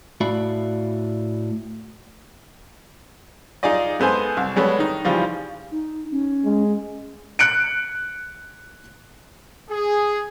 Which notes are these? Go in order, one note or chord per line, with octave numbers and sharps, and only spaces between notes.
A2 F#4 D5 E5 F5 B5
D#4 F4 G#4 D5 D#5
G#3 B3 A4 C5 G#5
C2
G3 G#3 B3 A4 C#5
D#3 D#4
C#3 E3 F3 G3
D#4
C#4
G#3
F#6 C#7 D7
G#4